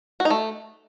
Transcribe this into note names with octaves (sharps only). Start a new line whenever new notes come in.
F#4
D#4
A3